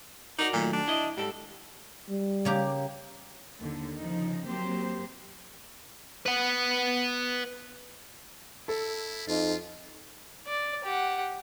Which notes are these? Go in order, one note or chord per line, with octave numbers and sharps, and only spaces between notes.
D#4 F#4 A#4 D5
A#2 D#3 F#3 A3
D4
E4 D#5
G#2 G3 A4
G3
C#3 A#3 G4
D#2 D3
C#3 F3 D#4
F#3 A#3 C4 G4 C5
B4 F#5
E4 A4
F2 D#4 F4
D5
G4 F#5